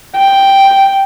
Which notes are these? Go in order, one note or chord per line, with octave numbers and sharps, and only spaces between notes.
G5